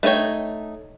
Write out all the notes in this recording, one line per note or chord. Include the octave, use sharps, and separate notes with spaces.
A3 D#4 G#4 C#5 G5